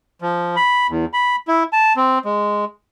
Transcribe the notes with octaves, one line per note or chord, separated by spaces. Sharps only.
F3
B5
E2
B5
E4
A5
C4
G#3